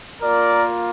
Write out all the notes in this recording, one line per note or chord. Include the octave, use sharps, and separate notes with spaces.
A#3 F4 A#4 D5